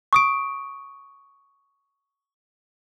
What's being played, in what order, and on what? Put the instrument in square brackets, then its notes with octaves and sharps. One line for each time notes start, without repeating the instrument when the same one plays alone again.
[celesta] C#6 D#6 D7